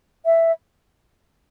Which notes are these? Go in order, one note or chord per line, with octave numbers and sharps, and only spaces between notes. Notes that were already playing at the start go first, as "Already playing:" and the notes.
E5